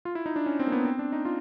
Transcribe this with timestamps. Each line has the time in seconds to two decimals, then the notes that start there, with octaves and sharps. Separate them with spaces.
0.05 F4
0.15 E4
0.26 D#4
0.36 D4
0.46 C#4
0.59 C4
0.67 A#3
0.72 B3
0.85 C4
0.99 D4
1.12 D#4
1.25 F4